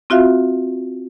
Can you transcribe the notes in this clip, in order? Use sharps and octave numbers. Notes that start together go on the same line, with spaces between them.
C4 F4 F#4 E5 F5